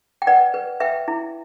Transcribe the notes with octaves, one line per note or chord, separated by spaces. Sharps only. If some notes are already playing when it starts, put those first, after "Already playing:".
G5
B4 D5 F#5
B4
B4 E5 G5
E4